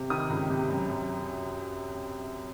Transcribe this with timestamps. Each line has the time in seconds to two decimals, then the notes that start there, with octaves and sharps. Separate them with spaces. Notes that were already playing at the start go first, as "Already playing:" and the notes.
Already playing: C3
0.10 D#3 D#6
0.30 C#2
0.50 C3
0.69 F#2
0.89 F#2